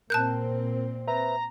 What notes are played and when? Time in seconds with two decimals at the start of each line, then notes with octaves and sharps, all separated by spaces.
0.10 A#2 C4 A#4 A5 F#6 G6
1.08 B4 C5 E5 A#5